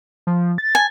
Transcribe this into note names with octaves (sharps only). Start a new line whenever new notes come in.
F3
A6
G#5